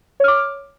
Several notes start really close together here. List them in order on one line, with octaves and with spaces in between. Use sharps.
C#5 F6 D6